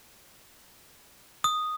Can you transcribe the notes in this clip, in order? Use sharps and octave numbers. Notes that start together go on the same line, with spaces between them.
D#6